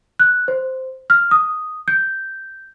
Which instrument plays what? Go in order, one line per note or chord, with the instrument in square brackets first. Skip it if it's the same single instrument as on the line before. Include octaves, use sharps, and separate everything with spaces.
[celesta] F#6
C5
F6
D#6
G6